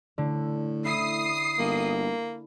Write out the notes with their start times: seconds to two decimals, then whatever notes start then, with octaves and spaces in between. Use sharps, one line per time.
0.18 A2 D3
0.85 E4 D#6 C7
1.59 G1 A#3